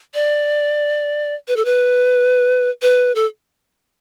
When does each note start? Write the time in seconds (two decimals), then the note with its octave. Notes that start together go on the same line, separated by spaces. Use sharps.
0.14 D5
1.48 B4
1.56 A4
1.65 B4
2.82 B4
3.15 A4